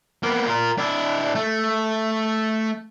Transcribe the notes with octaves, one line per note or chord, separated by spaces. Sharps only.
A#3 B3
F4 A#4
D4 E4
A3